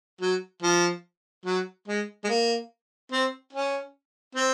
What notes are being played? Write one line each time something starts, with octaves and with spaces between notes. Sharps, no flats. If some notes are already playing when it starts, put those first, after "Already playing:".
F#3
F3
F#3
G#3
G#3
A#3
C4
C#4
C4